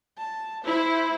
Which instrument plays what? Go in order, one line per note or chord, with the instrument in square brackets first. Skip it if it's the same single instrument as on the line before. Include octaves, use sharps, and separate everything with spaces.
[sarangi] A5
[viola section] E4 [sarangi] C5